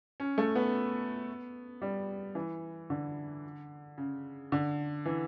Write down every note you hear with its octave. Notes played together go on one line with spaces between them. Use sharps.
C#4
A3
B3
G3
E3
D3
C#3
D3
E3